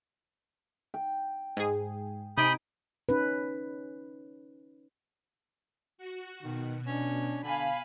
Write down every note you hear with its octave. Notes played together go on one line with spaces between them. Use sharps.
G5
G#2 G#4
C3 D#4 G#5 B5 D#6 G6 D7
C#4 D#4 B4
F#4
B2 D#3
C#4 D4
D3 F5 G#5 B5